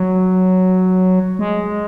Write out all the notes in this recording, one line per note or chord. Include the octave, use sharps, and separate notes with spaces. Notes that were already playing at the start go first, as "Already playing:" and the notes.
Already playing: F#3
G#3